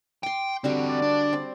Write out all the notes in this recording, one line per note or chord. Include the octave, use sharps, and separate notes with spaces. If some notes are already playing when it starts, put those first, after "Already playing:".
G5 C6 D6
E2 D3 G3 C4 F#4
D5
D4
C4